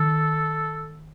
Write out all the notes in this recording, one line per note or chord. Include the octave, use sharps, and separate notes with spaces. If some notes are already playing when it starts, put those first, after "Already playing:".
Already playing: D#3 A4